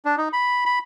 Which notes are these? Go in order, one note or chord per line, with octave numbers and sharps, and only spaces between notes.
D4
D#4
B5
B5